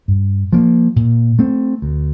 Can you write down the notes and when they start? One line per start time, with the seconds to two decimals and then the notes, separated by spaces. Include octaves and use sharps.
0.08 G2
0.53 F3 A#3
0.96 A#2
1.39 A3 C4
1.82 D2